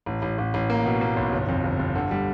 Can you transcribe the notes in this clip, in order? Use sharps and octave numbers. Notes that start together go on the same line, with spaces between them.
A1
A1
A1
A1
A#3
B2
A#3
B1
G1
F2
G1
G1
D3
G3